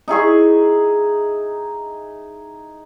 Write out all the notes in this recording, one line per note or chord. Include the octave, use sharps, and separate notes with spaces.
D#4 E4 G#4 C#6